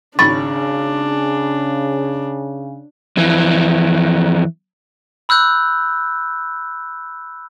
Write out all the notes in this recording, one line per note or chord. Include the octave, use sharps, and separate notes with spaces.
G#1 C#3 D4 B5 C#6 A6
F2 E3
B5 E6 F#6 G6